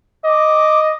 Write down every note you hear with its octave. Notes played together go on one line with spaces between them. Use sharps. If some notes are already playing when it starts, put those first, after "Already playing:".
D#5 D6